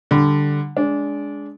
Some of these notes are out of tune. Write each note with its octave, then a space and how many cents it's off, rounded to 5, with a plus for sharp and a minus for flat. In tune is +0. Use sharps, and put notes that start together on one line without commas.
D3 +0 G3 +0
G#3 +0 D4 -25